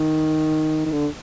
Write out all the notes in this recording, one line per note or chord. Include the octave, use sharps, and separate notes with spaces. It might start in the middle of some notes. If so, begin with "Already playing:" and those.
Already playing: D#3
D#3
D3